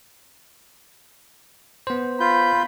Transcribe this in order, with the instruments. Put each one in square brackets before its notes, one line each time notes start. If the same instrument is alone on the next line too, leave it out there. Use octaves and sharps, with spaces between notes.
[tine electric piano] B3 C5
[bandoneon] F4 G6 [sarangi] B5